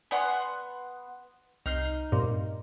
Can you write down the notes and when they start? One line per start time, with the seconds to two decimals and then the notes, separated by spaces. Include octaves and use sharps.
0.11 B3 D5 F#5 G#5 C6
1.66 C2 D#4 F6 C7
2.12 G2 A#2 C4